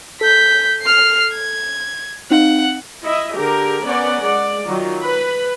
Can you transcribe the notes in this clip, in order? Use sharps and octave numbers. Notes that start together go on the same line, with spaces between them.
A4 G6 B6
F6 C7
G#6
C4 D#4 F5 F#5
E4 D#5 E5
D3 G4 G#4 A#4
B3 C#4 A#4 D5 F#5
G#3 D5
D#3 F#3 F4
B4 B5